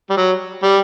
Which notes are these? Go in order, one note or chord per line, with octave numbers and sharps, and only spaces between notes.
G3
F#3
G3